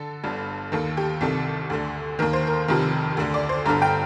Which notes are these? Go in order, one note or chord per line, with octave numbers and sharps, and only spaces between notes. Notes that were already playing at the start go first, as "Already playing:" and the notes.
Already playing: D3 A4
G1 G2 D3
D#2 D#3 A4
G4
C2 C3 D#3 A4
D2 D3
D#2 D#3 A#4
C5
A#4
F1 F2 C3 D#3
D2 D3
D5
C5
G1 G2 D3 A#5
G5